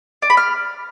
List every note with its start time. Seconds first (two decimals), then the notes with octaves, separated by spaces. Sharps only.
0.22 D5
0.30 B5
0.37 F6